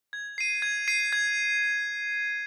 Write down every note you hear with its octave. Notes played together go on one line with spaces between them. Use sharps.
G#6
C7 D#7
G#6
C7 D#7
G#6